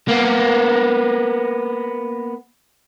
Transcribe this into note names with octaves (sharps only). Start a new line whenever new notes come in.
A#3 B3